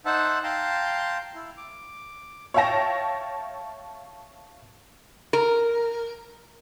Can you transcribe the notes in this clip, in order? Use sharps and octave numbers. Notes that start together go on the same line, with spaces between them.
D#4 C5 E5 F#5 A5
F5 G5 A5 A#5 C6
E4
D6
C#5 E5 F5 G5 A5 A#6
A#4